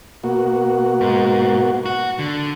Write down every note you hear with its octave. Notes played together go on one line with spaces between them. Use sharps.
B2 A#3 F#4
G#2
F#4
D3